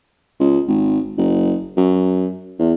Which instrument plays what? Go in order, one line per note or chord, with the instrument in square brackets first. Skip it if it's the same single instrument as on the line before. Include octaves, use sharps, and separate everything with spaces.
[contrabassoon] C#2
G#1
F#1
F#2
E2